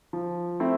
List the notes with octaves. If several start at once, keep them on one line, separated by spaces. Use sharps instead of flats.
F3
A3 C4 E4